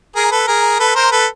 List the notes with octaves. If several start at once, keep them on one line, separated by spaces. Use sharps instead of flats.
G#4 A#4
A4 B4
G#4 A#4
A4 B4
A#4 C5
A4 B4